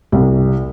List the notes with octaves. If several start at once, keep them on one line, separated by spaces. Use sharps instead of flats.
C2